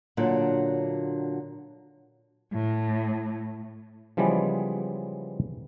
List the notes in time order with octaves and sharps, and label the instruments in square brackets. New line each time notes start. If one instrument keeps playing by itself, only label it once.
[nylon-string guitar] A#2 D3 F#3 D4 D#4
[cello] A2
[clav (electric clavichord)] C#3 E3 F3 G3 G#3 B3